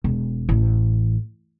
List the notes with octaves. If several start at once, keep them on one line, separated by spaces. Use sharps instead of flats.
E1
A1